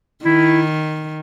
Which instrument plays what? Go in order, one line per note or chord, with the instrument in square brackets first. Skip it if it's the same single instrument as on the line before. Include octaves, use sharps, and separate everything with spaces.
[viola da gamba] D#3 [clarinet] E4